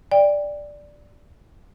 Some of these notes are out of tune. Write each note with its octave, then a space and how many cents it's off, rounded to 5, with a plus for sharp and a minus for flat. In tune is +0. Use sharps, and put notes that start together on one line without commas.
D5 +0 G5 +30